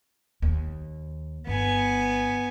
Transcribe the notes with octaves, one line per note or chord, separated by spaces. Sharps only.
D#2
G1 B3 G#5